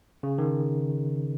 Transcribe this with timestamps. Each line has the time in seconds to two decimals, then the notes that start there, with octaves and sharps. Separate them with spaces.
0.23 C#3
0.38 D#3